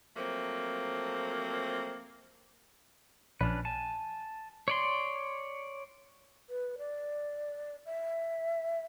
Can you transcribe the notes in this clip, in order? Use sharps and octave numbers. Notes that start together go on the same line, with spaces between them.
F3 F#3 A3 A#3 C4
A#1 C#4 D4 B4
G#5 A5
C#5 D5 C6
B4
D5
E5